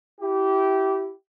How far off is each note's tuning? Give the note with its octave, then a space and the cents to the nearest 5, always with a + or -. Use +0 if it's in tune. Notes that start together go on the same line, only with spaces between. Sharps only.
E4 +0 G4 -20